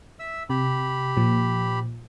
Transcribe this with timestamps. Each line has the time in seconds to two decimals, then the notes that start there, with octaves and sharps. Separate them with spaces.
0.20 E5 E6
0.50 C3 G4 B5
1.17 A#2 F3